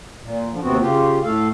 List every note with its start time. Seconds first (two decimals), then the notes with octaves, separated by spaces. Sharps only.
0.22 A#2
0.51 D3 F3
0.62 D#2 C3 B3 C4 F#4
0.80 C#3 F4 G4
1.24 A2 A3 A4 F5